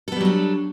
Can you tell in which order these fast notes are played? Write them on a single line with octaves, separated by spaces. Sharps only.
A4 B3 G3 F#3 D4